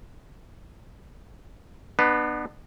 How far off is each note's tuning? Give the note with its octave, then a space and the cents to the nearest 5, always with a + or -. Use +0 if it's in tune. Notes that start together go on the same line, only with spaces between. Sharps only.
B3 -5 D4 +40 B4 +0